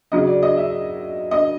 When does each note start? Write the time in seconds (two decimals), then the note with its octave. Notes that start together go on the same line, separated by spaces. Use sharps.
0.12 C#3 F#3 D#5
0.27 D5
0.43 D#5
0.57 E5
1.31 D#5